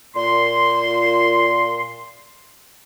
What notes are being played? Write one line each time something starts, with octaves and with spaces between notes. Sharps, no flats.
A#2 C6